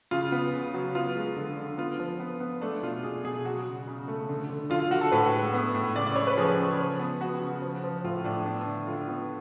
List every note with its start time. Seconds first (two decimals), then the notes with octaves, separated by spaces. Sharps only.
0.11 C#3 F4
0.32 B3
0.54 C#3
0.74 F#3
0.95 B3 F4
1.16 G#3
1.36 D3
1.57 D3
1.78 B3 F4
2.00 F3
2.20 B3
2.40 B3
2.61 A3 D4
2.82 B2 F4
3.03 B2 G#4
3.25 B2 G#4
3.45 F#3 F#4
3.66 C#3
3.88 C#3
4.08 A3
4.29 D3
4.50 D3
4.70 D3 F4
4.80 F4
4.91 D3 F#4
5.01 A4
5.12 A2 B4
5.33 G#3
5.54 B3
5.75 A2
5.95 C#3 D5
6.06 D5
6.16 C#3 C#5
6.27 B4
6.37 F3 G#4
6.57 C#3
6.79 F3
6.99 B3
7.21 B3 F#4
7.41 C#3
7.62 F3
7.84 F3
8.04 A2 F4
8.24 A2 D4
8.45 B3 D4
8.66 D3
8.87 D3 F4
9.08 B3